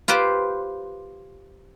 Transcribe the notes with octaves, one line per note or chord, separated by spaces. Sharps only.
F4 G4 B4 C5